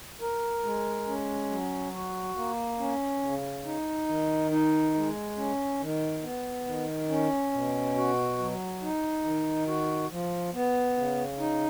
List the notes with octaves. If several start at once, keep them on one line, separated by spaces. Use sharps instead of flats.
A#4
G#3
C#4
F#3
F#4
A#3
C#4
C#3
D#4
D#3
D#4
G#3
C#4
D#3
B3
D#3
C#4
B2
F#4
F#3
D#4
D#3
F#4
F3
B3
C#3
D#4